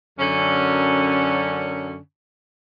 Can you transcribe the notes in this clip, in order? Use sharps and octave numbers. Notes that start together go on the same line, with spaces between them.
F#2 D3 C#4